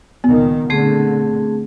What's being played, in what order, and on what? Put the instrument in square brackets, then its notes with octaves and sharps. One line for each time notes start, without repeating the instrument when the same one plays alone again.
[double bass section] C#2 A#2 D#3 [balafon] B3
[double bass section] D3 [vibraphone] A3 C4 G#4